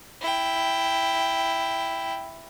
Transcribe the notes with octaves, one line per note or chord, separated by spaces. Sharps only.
E4 G5